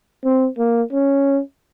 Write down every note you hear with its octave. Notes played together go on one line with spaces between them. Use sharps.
C4
A#3
C#4